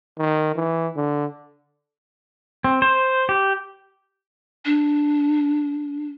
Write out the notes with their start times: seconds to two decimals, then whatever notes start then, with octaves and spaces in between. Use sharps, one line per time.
0.18 D#3
0.56 E3
0.96 D3
2.64 C4
2.82 C5
3.29 G4
4.65 D4